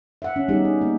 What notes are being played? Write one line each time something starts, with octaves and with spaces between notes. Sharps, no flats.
E5 F#5
C#4
G3 B3 C#4 D#4 G4 G#4
D#4
A#3